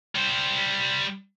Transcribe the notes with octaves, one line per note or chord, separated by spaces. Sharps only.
G3 C5